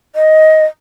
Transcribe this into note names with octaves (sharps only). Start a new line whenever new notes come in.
D#5